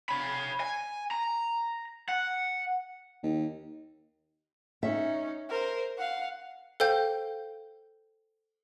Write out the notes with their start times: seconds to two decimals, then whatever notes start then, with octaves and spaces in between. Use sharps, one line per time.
0.09 C#5 B5
0.60 G#5
1.11 A#5
2.09 F#5
3.23 D#2
4.83 C#4 D#4 E5
5.49 A#4 C5
5.97 F5 F#5
6.80 A4 C5 F5 G5 G6